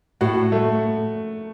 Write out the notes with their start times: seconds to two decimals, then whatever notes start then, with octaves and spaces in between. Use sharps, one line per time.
0.21 A2 F#4
0.52 A3